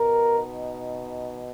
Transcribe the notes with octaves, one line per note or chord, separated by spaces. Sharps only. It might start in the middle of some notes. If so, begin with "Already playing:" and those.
Already playing: B2 A#4
D#4